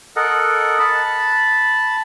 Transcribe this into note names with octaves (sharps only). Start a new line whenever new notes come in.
A4 A#4 D#5 F#5
A5 B5